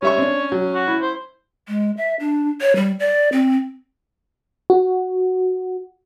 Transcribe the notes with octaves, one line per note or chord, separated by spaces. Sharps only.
G3 C#4 C#5 E5 C#6
C4 D4
F#3
F#4
E4
C5
G#3
E5
D4
C#5
G3
D5
C4
F#4